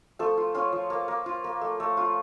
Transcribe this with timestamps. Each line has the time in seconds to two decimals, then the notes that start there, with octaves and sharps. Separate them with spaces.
0.19 F3 A3 A4
0.37 F4
0.55 C#4 F4 C#5
0.73 F3
0.90 A#3
1.08 A#3
1.26 F4
1.44 A#3
1.61 A3
1.80 A3
1.97 F4